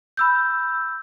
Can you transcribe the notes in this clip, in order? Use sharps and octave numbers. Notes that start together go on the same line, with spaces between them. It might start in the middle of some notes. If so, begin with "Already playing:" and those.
B5 E6 G6